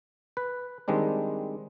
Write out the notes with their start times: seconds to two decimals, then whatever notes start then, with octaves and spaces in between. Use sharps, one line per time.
0.37 B4
0.88 D#3 G3 G#3 C4 D4